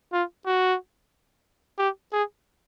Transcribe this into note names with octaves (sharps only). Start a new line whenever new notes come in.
F4
F#4
G4
G#4